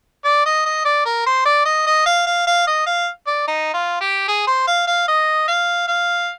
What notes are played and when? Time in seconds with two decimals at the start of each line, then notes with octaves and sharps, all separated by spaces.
0.25 D5
0.46 D#5
0.66 D#5
0.85 D5
1.06 A#4
1.26 C5
1.45 D5
1.65 D#5
1.87 D#5
2.06 F5
2.27 F5
2.47 F5
2.67 D#5
2.87 F5
3.27 D5
3.48 D#4
3.74 F4
4.01 G4
4.28 G#4
4.47 C5
4.67 F5
4.88 F5
5.08 D#5
5.48 F5
5.88 F5